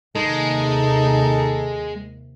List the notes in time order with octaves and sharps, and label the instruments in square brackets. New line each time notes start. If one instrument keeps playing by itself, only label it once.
[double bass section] D#2 C3 [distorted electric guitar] G#3 [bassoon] D#4 [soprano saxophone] A4